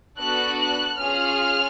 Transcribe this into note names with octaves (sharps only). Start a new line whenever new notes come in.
B3 D4 F#4 A4 F#6
F#6
C#4 F4 G#4 F6